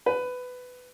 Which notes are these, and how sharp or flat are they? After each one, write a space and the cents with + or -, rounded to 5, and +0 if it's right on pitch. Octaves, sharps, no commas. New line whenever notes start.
B4 +15